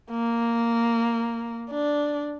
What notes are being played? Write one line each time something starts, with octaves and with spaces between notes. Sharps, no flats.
A#3
D4